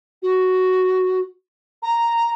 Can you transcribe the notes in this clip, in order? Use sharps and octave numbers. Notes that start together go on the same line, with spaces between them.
F#4
A#5